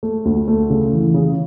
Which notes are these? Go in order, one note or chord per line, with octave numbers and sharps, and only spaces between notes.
A3
D2
A3
C#3
E3
C#3